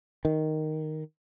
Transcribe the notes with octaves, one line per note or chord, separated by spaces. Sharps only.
D#3